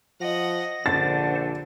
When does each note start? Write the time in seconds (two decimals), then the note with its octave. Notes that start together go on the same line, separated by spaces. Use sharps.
0.20 F3 D#5 F#5 A#6
0.86 A#1 D3 C5 F#5 A5 A6